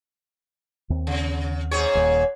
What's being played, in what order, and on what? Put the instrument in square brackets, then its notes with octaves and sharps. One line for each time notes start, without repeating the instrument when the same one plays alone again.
[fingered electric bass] D#2 C4
[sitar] C#3
G#2 G#4 C#5
[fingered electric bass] D#1 D#2